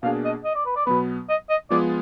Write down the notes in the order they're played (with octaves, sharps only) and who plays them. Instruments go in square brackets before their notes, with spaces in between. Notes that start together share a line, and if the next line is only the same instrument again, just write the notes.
[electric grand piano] B2 A#3 D4 G#4 [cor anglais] F5
[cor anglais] D#5
D#5
D5
B4
D5
[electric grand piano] B2 F#3 B3 [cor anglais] B4
[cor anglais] D#5
D#5
[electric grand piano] F3 G#3 B3 F4 G#4 [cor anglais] D5